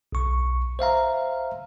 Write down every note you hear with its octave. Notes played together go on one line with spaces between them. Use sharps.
B1 C#6
C5 E5 F5 A#5